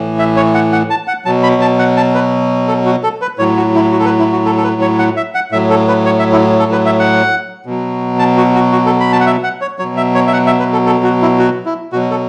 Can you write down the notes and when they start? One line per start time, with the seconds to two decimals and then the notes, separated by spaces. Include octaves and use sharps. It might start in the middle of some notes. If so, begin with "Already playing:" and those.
Already playing: A2 E3
0.19 E5
0.36 C#5
0.54 F#5
0.72 F#5
0.90 A5
1.07 F#5
1.25 B2 F#3 A5
1.43 B5
1.61 A5
1.79 F#5
1.97 A5
2.15 B4
2.68 A4
2.86 F#4
3.03 A4
3.22 B4
3.39 A2 F#3 C#5
3.57 F#4
3.75 E4
3.92 F#4
4.00 A4
4.05 B4
4.19 E4
4.32 F#4
4.46 A4
4.57 A4
4.63 B4
4.81 C#5
4.99 F#5
5.17 E5
5.35 F#5
5.52 A2 F#3 E5
5.70 A4
5.88 B4
6.06 C#5
6.19 E5
6.32 E4
6.59 A4
6.72 B4
6.86 E5
6.99 F#5
7.66 B2 F#3
8.19 A5
8.37 F#4
8.55 F#4
8.72 F#4
8.86 A4
9.00 B5
9.13 A5
9.20 F#5
9.26 E5
9.43 F#5
9.61 C#5
9.79 B2 F#3 C#5
9.97 E5
10.15 C#5
10.27 E5
10.33 F#5
10.46 E5
10.59 B4
10.72 A4
10.86 A4
11.04 F#4
11.22 E4
11.39 F#4
11.66 E4
11.92 B2 F#3 F#4
12.11 A4